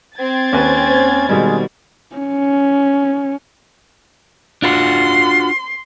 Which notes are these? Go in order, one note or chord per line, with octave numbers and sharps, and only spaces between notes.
C4 G#6 A6
D#2 C#4 B4
B2 D#3 G3 G#3
C#4
D4 F4 F#4 C6